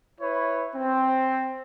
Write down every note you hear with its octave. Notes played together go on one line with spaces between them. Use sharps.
E4 B4 C#5
C4